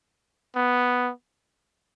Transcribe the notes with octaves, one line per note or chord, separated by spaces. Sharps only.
B3